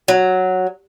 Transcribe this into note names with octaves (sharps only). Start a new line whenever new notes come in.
F#3